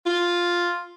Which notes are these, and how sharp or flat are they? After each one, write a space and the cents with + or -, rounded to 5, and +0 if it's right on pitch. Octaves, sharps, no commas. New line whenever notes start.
F4 +0